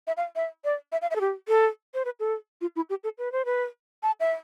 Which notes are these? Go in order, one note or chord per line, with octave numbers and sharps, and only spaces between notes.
E5
F5
E5
D5
E5
F5
E5
A4
G4
A4
C5
B4
A4
F4
E4
G4
A4
B4
C5
B4
A5
E5